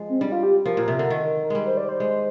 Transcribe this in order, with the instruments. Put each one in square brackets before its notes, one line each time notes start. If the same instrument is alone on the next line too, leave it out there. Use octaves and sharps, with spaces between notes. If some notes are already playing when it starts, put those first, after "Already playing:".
Already playing: [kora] F3 G#3
[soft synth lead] C4
[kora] G3 [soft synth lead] D4
[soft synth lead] F4
G4
[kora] F3 [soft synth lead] A#4
[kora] A#2
C3
D3
D#3
[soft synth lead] A#4
[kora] G3 G#3
[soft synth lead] C5
D5
C5
[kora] G#3